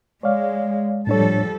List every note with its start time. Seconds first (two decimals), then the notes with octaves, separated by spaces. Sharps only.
0.23 G#3 C#5 D5 F5
1.07 A2 F3 G3 D4 A4 C#5